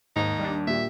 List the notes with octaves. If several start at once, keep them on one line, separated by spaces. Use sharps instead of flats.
D#2 G#2 D#4
G3 D4
A#2 G4 E5